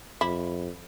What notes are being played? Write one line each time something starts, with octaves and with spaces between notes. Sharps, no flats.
F2 E4